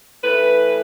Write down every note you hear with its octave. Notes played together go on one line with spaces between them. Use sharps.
A2 E3 B4